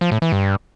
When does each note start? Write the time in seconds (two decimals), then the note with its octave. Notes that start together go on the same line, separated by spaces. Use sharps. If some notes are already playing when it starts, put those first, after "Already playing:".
0.01 F3
0.12 A2
0.22 E3
0.32 G2